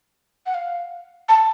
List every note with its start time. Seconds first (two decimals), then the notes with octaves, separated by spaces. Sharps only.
0.46 F#5
0.54 F5
1.29 A5